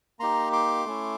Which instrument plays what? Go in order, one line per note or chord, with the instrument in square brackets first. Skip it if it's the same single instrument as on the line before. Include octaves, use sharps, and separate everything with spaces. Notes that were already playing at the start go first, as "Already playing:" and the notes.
[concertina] A#3 D#4 G4 A#5 C6
C6 D6
A3 C#4 E4